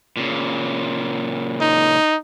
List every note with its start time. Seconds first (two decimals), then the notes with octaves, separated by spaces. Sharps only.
0.17 A#2 C#3
1.61 D#4